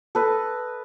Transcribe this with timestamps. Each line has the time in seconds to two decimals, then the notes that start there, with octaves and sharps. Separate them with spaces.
0.15 A4 B4 D#5